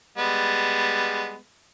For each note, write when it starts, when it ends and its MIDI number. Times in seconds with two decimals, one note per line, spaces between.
0.18 1.36 55
0.18 1.36 56
0.18 1.36 59